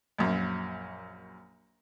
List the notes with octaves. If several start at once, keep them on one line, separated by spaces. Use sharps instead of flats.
A#1 F#2